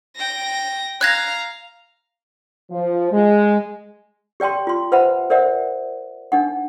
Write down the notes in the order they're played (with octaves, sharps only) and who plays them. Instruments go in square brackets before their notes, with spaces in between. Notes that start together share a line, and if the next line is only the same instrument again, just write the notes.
[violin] G5 A#6
[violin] F5 A#5 [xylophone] F#6 G#6 A#6
[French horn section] F3
G#3
[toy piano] G4 D5 G5 A5 C6
F4 C6
B4 C5 E5 F#5 A5 B5
A#4 C5 D5 E5 F#5
D4 D#4 F#5